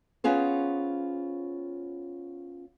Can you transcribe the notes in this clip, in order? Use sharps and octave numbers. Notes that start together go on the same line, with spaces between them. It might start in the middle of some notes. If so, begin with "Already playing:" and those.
B3 C#4 F4 G#4 C5